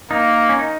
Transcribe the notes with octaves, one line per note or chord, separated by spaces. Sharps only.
A#3 D#4
C#4
D#4